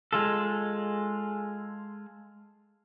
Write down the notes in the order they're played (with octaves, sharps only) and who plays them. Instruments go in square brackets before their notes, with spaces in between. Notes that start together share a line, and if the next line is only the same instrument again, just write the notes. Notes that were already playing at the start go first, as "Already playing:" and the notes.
[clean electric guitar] G#3 F4 A4